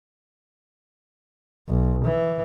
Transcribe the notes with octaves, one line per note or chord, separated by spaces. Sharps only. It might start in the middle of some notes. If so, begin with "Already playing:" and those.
B1
E3